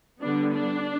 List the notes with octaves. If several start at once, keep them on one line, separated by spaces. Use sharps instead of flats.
D3 G3 B3 D4
D4